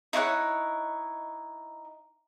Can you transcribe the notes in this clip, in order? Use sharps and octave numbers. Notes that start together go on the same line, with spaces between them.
D#4 E4 C#5 F#5